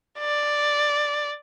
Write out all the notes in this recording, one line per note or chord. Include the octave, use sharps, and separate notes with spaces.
D5